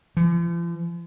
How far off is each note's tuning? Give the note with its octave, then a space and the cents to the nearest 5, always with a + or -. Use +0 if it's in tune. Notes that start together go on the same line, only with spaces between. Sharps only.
F3 -45